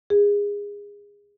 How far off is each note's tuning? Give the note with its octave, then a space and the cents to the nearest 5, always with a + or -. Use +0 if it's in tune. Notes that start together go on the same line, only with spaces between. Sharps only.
G#4 -25